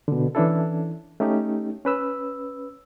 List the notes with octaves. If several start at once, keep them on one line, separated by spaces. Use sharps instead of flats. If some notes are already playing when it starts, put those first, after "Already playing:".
B2 D3
E3 C#4 D4 E4 A4
A3 C#4 D#4 G4
C#4 B4 E6